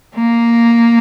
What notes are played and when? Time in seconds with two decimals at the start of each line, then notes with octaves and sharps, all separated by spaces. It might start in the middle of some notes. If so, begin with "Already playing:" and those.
0.16 A#3